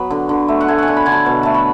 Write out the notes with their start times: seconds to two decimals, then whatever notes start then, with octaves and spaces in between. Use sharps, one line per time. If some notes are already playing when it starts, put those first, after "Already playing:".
Already playing: F#3 B3 B5
0.10 D3
0.29 D3
0.48 A3
0.60 F#5
0.68 A3 G#5
0.78 F#5 G#5
0.88 D3
0.96 B5
1.06 D3 G#5
1.12 A5
1.26 B2
1.43 A3 A5
1.54 B5